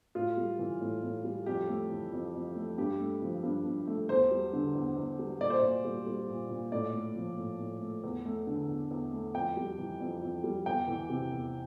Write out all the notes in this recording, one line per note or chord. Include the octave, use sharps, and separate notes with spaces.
A2 F4
G3
E3
A2
A2
G3
F2 G4
A3
E3
F2
F2
A3
G2 G4
A3
F3
G2
G2
A3
E2 C5
G3
D3
E2
E2
G3
A#2 D5
C5
A#2 D5
G3
G3
A#2
A#2
A2 D5
A3
F3
A2
A2
A3
E2
A3
D3
E2
E2
A3
F2 G5
G3
E3
F2
F2
G3
E2 G5
E3
C3
E2